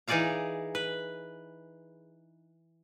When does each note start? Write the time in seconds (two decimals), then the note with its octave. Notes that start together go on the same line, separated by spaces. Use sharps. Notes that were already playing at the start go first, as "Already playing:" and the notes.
0.08 E3 D#4 G#4 D5 F5 A#5
0.75 B4